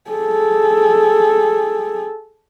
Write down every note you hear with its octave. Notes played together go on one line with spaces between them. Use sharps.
G#4 A4